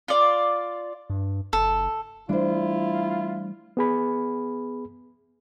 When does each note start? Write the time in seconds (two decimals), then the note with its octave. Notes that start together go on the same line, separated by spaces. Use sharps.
0.08 F4 D5
1.10 G2
1.53 F#1 A4
2.29 E3 G3 A3 D4 E4 F4 C5
3.77 B3 G#4 B5